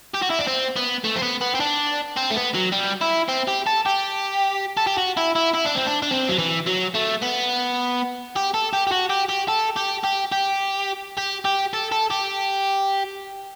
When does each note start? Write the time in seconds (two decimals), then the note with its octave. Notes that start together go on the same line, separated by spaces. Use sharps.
0.14 G4
0.22 F#4
0.30 E4
0.39 D4
0.47 C4
0.76 B3
1.04 A3
1.16 C4
1.22 B3
1.41 B3
1.55 C4
1.60 D4
2.17 C4
2.30 A3
2.36 B3
2.54 F#3
2.72 G3
3.01 E4
3.29 C4
3.48 G4
3.67 A4
3.86 G4
4.77 A4
4.87 G4
4.98 F#4
5.17 E4
5.35 E4
5.54 E4
5.65 D4
5.75 C4
5.86 D4
6.02 D4
6.11 C4
6.29 F#3
6.39 E3
6.67 F#3
6.95 A3
7.23 B3
8.36 G4
8.54 A4
8.73 G4
8.87 G4
8.92 F#4
9.10 G4
9.29 G4
9.48 A4
9.76 G4
10.04 G4
10.32 G4
11.17 G4
11.45 G4
11.74 A4
11.92 A4
12.11 G4